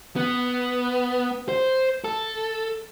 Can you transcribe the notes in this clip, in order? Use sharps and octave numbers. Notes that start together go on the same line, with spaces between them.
B3
C5
A4